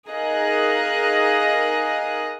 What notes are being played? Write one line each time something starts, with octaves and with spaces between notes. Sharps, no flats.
D#4 G#4 A#4 D#5 F5 F#6